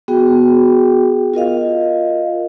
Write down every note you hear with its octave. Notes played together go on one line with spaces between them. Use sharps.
B3 F#4 G#4 G5
F4 A#4 D#5 F5